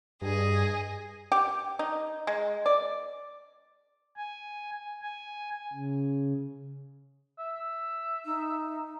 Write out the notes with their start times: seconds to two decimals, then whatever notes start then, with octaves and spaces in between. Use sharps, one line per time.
0.22 G2 G#4 D#5
1.32 G4
1.79 D#4
2.27 G#3
2.66 D5
4.17 G#5
5.02 G#5
5.73 C#3
7.39 E5
8.25 D#4